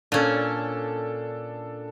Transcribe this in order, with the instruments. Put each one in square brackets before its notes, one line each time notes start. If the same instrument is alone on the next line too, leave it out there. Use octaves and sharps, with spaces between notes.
[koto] A#2 C#4 [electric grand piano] D4 A4